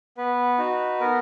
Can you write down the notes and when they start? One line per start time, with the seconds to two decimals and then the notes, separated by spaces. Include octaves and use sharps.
0.17 B3 B4
0.59 D#4 F#4
1.00 B3 A#4